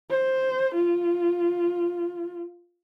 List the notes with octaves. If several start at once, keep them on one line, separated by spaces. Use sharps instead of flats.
C5
F4